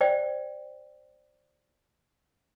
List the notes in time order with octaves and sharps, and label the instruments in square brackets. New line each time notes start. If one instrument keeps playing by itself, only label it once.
[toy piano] C5 D5 G5